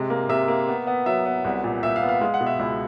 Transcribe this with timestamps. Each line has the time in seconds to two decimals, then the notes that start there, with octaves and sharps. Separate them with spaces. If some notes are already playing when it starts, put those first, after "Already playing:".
Already playing: C3 G#3 D#5
0.10 A#3
0.29 C3 E5
0.48 A#3
0.68 B3
0.87 B3
1.06 F#3 E5
1.25 B3
1.44 C2
1.64 A#2
1.83 A#2 E5
1.96 F5
2.02 B3
2.09 F5
2.21 G#3 F5
2.34 F#5
2.41 B2
2.46 E5
2.59 C#2 E5